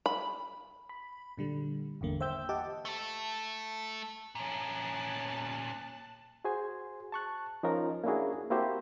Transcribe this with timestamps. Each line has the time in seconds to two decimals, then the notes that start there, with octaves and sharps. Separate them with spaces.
0.06 B5
0.89 B5
1.37 A#2 D3 G3
2.01 G#1 E2 D3 A#3
2.20 C5 E5 G5 E6 G6
2.49 G4 D#5 F#5 A5 D6
2.85 A3 A4
4.35 A#2 C#4 A5 F#6
6.45 F#4 G#4 C5 G#5
7.12 A5 C#6 F#6
7.63 F3 C#4 D#4 F4 A#4
8.04 A#3 C#4 D4 E4 F#4 G#4
8.50 A#3 C4 E4 F#4 G4 C5